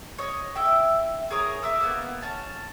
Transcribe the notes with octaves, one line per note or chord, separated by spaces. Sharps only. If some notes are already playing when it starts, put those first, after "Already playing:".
C#5 D#5
E4 E5 G5
G#4 A#4 C#5 D#6
E5 D6 E6
A#3 B3
C#4 A5